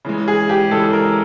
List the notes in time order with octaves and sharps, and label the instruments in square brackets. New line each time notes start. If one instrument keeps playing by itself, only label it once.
[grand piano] C#3 E3 G#3
[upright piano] G#4
G4
[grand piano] C#3 E3 G#3 [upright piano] A4
[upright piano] A#4